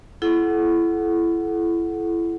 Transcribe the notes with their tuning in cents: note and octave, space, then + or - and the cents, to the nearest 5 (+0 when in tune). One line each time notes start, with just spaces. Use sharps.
E4 +30 A4 -40 F#5 +0